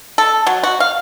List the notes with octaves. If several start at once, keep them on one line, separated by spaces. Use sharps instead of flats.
A4
F#3
F#4
F5